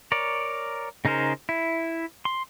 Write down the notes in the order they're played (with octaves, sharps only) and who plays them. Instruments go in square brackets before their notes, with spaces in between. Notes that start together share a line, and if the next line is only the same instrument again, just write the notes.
[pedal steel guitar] A#4 C#5 D5
C#3 D#4 G#4 A#4 C5
E4
C6